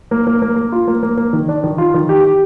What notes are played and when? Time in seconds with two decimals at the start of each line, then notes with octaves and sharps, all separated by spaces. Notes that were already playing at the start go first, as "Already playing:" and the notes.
0.11 A#3
0.27 A#3
0.42 A#3
0.56 A#3
0.72 F4
0.87 A#3
1.03 A#3
1.17 A#3
1.33 D#3
1.48 D4
1.64 D#3
1.78 F4
1.94 D#3
2.09 G4
2.24 G4